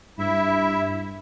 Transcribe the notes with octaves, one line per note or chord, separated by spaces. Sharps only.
G2 E4 E5